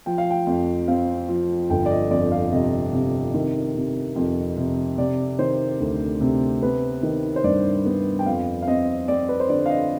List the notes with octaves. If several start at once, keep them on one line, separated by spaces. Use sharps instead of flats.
F3 G5
F5
G5
F2
C4 F5
F3
G1 G5
D5
D#5
F2 D5
F5
C3 D#5
C3
D#3
C3
F2
C3
C3 D5
D#3 C5
D2
C3
B3 B4
D#3
C5
G2 D5
B3
G5
F2 F5
F5
C4 D#5
C4 D5
B4
C5
D3 D5
F5
D#5